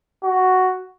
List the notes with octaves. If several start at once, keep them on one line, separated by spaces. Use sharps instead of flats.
F#4